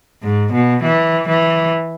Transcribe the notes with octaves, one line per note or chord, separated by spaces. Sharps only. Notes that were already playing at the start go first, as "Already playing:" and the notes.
G#2
B2
E3
E3